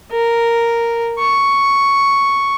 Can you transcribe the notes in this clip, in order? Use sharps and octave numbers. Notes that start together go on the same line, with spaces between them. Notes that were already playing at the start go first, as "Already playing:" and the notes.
A#4
C#6